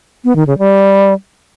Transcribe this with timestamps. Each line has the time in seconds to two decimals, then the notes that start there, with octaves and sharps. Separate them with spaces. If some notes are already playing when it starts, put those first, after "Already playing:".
0.24 B3
0.36 D#3
0.47 C#3
0.59 G3